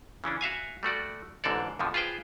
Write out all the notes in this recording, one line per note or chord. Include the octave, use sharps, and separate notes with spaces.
C#3 E3 C#4 D4
F#4 E5 F5 G#5
G3 A3 F#4 D5
A1 G#2 D3 C4 A4 D5
F2 B2 D3 F3
F4 G#4 B4 C5 G5